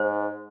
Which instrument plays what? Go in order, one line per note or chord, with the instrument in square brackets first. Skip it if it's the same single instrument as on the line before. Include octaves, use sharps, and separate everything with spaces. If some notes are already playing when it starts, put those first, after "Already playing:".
Already playing: [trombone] G#2 [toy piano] C5